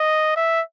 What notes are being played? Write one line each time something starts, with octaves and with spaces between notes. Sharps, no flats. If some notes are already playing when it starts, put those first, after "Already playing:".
Already playing: D#5
E5